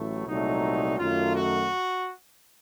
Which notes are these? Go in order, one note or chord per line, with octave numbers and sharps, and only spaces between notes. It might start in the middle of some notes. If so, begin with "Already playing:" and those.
Already playing: A1 A2 F#3 A3
C2 A#2 F#3 A3 D#4
F#2 D#3 F#3 A3 F4
F#4